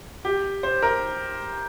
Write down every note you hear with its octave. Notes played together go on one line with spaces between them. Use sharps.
G4
C5
A#4